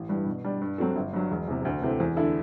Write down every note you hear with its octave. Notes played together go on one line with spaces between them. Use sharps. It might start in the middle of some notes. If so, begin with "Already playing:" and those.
Already playing: A1
G2 E3 G3
B2
G3 D4
G2
F#3 C4 F#4 A4
G1
G2 F#3
E1
E2 C3
D2
C3 E3 A3 C4
E2
D3 A3 E4 A4